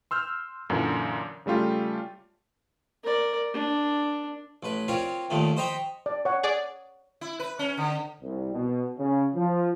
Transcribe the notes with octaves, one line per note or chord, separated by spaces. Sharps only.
C6 E6 F6 G6
F#2 A#2 D3 E3
C#3 G3 A3 F4 G4
A#4 D5
D4
A1 B4
C4 F4 A#4 C#5 D5
D#2 A#2 D#3 A3
C5 D#5 G5 A#5 B5 C#6
D5
C#5 F#5
G#4 D5
E4
B4
C#4
D3
C2
B2
C#3
F3